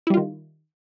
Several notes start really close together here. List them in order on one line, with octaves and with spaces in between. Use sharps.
E4 G3 F4 D#3